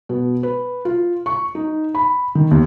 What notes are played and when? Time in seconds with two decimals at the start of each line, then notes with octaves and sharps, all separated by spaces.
0.09 B2
0.43 B4
0.85 F4
1.26 C#6
1.55 D#4
1.95 B5
2.35 D#3
2.51 D#2